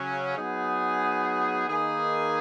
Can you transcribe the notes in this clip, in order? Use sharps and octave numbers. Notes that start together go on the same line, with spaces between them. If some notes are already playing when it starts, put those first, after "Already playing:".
Already playing: C#3 F#3 C#4
F#3 B3 D#4 G#4
D#3 A#3 D#4 G#4 B4